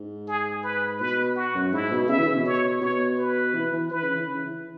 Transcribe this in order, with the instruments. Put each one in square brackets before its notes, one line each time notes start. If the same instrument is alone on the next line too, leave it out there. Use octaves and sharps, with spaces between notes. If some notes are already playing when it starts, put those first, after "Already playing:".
Already playing: [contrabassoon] G#2
[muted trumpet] G#4
B4
[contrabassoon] B2 [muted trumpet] B4
[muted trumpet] F#4
[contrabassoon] F#2
[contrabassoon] G#2 [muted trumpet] E4
[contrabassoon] B2
[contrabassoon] C#3 [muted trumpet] E5
[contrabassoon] E3
C#3
B2
[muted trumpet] C#5
[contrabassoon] B2 [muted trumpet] C#5
[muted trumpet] B4
[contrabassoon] E3
E3
[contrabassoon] E3 [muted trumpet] B4
[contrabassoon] C#3
E3
C#3
E3